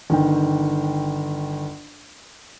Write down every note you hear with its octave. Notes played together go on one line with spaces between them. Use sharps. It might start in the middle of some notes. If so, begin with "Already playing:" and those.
G1 D#3 G5